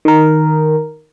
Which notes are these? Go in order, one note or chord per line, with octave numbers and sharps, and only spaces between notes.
D#3 A#4